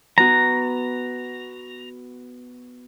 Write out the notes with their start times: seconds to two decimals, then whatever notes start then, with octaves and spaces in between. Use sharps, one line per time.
0.18 B3 F#4 A#5